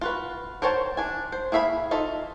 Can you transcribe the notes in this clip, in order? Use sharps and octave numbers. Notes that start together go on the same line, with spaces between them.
F4 F#4 B4
A#4 C5 C#5 G5 A5
D4 G#5
C5
A#3 G#4 E5 F5 B5
D#4 F4 A4 E5